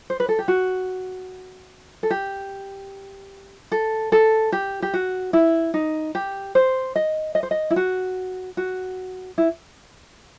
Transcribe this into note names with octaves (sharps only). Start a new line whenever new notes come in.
C5
B4
A4
G4
F#4
A4
G4
A4
A4
G4
G4
F#4
E4
D#4
G4
C5
D#5
D#5
C5
D#5
E4
F#4
F#4
E4